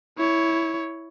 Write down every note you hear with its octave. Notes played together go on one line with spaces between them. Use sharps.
E4 C#5